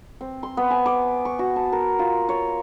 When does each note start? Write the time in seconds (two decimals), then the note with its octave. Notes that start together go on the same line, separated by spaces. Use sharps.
0.21 C4
0.43 C6
0.57 B3
0.70 G#5
0.86 D6
1.25 C#6
1.39 F#4
1.56 A5
1.72 A#4
1.99 F4
2.29 C#5